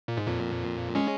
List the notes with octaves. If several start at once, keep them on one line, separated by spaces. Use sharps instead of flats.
A#2
G#2
F2 A#2
G#3 C#4